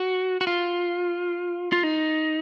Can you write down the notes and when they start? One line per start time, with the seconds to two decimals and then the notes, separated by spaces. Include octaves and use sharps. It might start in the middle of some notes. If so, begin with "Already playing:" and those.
Already playing: F#4
0.41 F#4
0.47 F4
1.72 F4
1.83 D#4